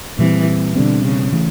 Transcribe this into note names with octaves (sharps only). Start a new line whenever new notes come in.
A#2 E3 G3 C4
B2 D3 G3 C4
C#3
E3 A3